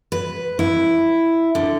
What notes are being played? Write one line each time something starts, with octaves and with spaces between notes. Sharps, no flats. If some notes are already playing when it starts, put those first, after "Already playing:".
B4
E4
D3